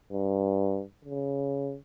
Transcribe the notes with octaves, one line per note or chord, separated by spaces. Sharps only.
G2
C#3